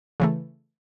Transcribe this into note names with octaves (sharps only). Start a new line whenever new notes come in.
C#3 E3 A3